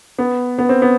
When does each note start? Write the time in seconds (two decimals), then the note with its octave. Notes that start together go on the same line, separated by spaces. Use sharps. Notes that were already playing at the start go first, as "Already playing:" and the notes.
0.18 B3
0.58 B3
0.69 C4
0.82 B3